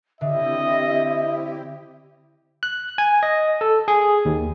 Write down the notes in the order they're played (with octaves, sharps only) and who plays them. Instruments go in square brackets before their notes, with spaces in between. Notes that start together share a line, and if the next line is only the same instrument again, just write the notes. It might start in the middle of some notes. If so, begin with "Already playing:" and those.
[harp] D3 [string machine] C4 E4 G4 [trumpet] D#5 [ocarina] E5
[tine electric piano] F#6
G#5
D#5
A4
G#4
D#2